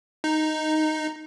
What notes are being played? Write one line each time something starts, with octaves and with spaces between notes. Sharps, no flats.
D#4